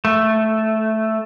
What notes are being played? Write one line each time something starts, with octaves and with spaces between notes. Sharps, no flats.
A3